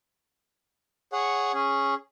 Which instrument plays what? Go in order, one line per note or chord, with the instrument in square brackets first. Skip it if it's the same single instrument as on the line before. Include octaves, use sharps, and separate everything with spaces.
[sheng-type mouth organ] G#4 C#5 F#5
C#4 G#4